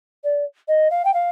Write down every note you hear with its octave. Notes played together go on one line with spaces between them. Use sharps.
D5
D#5
F5
G5
F5